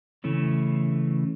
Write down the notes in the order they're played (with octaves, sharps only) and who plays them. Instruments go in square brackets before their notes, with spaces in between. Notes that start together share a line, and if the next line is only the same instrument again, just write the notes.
[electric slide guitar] C#3 E3 A3 C#4